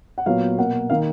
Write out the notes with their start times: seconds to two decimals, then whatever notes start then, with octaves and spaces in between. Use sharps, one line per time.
0.18 F#5
0.26 A#2 F#3 B3 F5
0.58 B2 A#3 F#5
0.90 D#3 A#3 F5